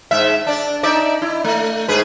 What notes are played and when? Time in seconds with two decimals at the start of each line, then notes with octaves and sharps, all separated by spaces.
0.11 G#2 E5
0.47 D4 D5
0.83 D#4 D5 E5
1.22 E4
1.44 A3
1.88 G#2 G#4 B4